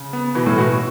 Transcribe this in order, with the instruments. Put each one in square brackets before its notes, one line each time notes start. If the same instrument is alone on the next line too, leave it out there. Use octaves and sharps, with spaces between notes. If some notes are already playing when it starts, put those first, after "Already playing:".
Already playing: [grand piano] C#3
[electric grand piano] B3
[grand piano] B2 [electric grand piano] E3
[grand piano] A2
[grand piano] B2 [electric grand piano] F#4